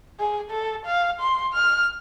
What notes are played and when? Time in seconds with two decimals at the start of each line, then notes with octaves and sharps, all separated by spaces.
0.20 G#4
0.51 A4
0.86 F5
1.20 C6
1.53 F6